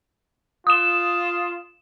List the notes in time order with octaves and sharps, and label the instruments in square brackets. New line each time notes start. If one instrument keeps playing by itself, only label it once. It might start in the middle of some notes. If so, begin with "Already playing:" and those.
[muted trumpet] F4 [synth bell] D#6 E7